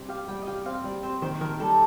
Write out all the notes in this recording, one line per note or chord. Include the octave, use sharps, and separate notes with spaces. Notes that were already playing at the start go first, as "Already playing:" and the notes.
Already playing: C3 G3
G4 F5
G3 G5
D#5
G4 F5
C4 F5
G3 D5
C4 C5
D#3 C5
D#3 A#4
G3 A4